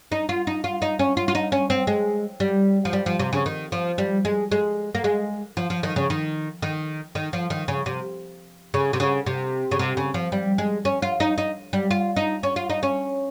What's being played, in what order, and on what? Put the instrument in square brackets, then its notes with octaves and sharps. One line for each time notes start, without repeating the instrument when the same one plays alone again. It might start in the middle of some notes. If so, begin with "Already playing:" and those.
[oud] D#4
F4
D#4
F4
D#4
C#4
F4
F4
D#4
C#4
C4
G#3
G3
F3
G3
F3
C3
C#3
D#3
F3
G3
G#3
G#3
A#3
G#3
F3
F3
D#3
C#3
D#3
D#3
D#3
F3
D#3
C#3
C3
C#3
C3
C#3
C3
C#3
C3
C#3
F3
G3
G#3
C#4
F4
D#4
D#4
G3
F4
D#4
C#4
F4
D#4
C#4